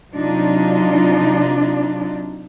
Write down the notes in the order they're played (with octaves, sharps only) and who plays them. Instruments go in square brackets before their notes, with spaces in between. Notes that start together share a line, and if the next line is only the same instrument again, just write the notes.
[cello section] C3 F#3 D4 D#4 F4